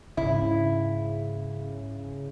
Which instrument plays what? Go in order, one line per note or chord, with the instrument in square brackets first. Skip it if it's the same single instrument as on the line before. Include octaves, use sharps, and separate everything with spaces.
[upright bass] G#2 [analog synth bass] C#3 [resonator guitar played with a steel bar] E4